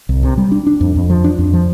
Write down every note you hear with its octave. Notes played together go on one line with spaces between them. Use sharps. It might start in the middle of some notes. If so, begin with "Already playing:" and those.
C2
C3
G3
D4
D4
F2
F2
F3
D4
F2
F3